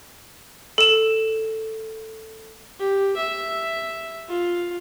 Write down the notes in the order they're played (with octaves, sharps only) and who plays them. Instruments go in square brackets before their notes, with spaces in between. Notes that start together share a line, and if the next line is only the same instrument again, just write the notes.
[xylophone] A4 E7
[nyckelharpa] G4
E5
F4